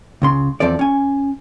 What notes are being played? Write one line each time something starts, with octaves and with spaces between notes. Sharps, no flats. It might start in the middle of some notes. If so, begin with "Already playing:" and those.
C#2 C#3 C6
E2 F3 C4 A4 D5
C#4 G#5